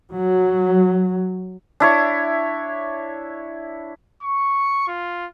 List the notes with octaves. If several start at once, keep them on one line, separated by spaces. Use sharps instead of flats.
F#3
D4 E4 C#5
C#6
F4